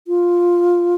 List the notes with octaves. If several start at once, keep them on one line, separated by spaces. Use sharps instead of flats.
F4